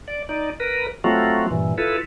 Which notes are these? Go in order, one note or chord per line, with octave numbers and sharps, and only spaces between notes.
D5
D#4 D5
A#4 B4
F#3 A3 C4 F4 F#4
G2 A#2 E3
E4 F4 A4 B4